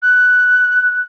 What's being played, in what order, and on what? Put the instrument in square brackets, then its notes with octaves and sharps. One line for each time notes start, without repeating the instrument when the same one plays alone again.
[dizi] F#6